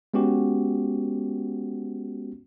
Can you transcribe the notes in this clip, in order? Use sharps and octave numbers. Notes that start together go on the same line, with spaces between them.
G#3 B3 C#4 F#4 G4